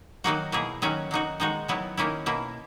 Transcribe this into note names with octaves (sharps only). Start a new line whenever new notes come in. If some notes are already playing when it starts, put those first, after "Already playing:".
D#3 F#3 A#3 D#4 F#4
B2 A#3 E4 G#4
D#3 F#3 C#4 F#4
F#3 A#3 D#4 F#4
D#3 G#3 D#4 F#4
D#3 F#3 B3 E4
D#3 A#3 C#4 E4
B2 A#3 E4